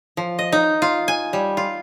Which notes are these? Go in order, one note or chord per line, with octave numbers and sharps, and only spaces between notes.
F3
D#5
D#4
F4
G#5
G3
F4